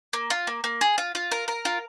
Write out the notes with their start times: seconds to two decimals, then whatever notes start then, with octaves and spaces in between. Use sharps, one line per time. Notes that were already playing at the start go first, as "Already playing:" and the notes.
0.13 A#3
0.30 F4
0.47 A#3
0.64 A#3
0.81 G#4
0.98 F4
1.15 F4
1.32 A#4
1.48 A#4
1.65 F4